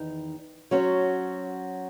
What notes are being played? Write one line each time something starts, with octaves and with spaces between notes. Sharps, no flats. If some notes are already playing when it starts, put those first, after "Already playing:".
Already playing: E2 D#3 D#4
F#3 C#4 F#4 C5